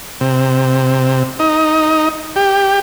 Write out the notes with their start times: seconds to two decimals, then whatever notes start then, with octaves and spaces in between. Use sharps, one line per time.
0.21 C3
1.39 D#4
2.36 G4